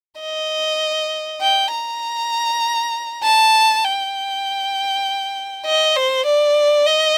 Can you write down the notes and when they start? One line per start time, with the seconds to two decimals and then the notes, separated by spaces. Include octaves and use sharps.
0.20 D#5
1.41 G5
1.72 A#5
3.23 A5
3.84 G5
5.66 D#5
5.96 C5
6.26 D5
6.87 D#5